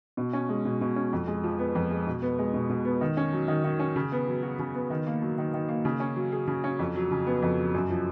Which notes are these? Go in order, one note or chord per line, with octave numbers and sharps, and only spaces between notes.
B2
C#4
G#3
B2
B2
C#4
F2
G#3
F3
B3
F2
G#3
B2
B3
G#3
B2
B2
B3
D#3
C#4
F#3
D#3
D#3
C#4
C#3
B3
F#3
F#4
C#3
B3
D#3
A#3
F#3
D#3
D#3
A#3
C#3
C#4
F#3
G#4
C#3
C#4
F2
F#3
C#3
B3
F2
F#3
F#2
F3